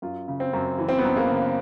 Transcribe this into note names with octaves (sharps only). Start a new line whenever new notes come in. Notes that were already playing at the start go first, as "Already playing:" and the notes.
F#2 F4
C#3
C4
F#2
E3
C4
B3
F#2
A#3
C#3